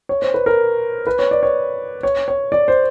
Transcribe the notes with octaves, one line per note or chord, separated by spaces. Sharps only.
C#5
C5
B4
A#4
B4
C#5
D5
C#5
C#5
C#5
D5
C5